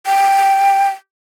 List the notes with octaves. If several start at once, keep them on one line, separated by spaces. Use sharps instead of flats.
G5